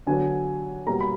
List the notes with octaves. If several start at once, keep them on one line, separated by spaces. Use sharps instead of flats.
D3 F#3 B3 D4 G#5
B2 G3 A#3 A#5
B5